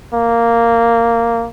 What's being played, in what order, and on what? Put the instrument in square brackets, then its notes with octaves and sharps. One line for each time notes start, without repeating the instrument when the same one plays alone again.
[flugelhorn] A#3